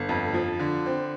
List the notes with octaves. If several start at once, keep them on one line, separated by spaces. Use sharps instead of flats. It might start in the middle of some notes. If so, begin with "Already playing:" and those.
Already playing: G1
F2
F3
D3
C4